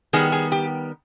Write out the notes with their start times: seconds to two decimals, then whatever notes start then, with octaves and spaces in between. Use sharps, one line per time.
0.13 D#3 G3 B3 G#4
0.32 G#4
0.52 G4